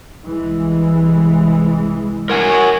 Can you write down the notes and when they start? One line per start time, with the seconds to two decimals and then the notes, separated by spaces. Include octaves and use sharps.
0.24 C2 E3 G#3
2.30 A#4 F#5 G#5